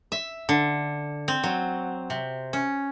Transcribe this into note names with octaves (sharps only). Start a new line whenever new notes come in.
E5
D3
C4
F#3
C3
C#4